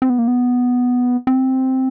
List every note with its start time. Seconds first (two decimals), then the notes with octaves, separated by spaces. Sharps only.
0.02 C4
0.10 B3
0.18 A#3
0.28 B3
1.27 C4